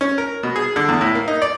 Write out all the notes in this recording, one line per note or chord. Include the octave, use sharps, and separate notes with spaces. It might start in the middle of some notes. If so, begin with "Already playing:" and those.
C#4
A#4
B2
G#4
D3
E2
A2
A#3
D#4
D5